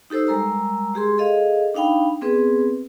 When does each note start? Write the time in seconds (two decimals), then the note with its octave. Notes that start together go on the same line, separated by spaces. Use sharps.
0.10 D#4 G4 A4 C5 E6
0.27 G3 G#3 A#4 A#5 E6
0.94 G#3 G4 G#4 C6
1.18 G#4 A4 D#5 F5
1.74 D4 D#4 F5 G5 B5
2.21 B3 C4 G#4 B4